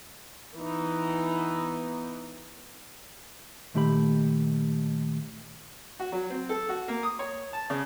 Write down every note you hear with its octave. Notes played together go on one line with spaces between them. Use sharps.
E3 B3 D#4
A#2 D#3 A3 G4 C5 B5
F#4
F#3
C4
A4
F#4
A#3
D#6
C#5
A5
C#3